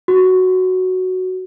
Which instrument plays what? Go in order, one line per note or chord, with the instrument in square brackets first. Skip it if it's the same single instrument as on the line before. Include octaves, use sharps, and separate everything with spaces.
[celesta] F#4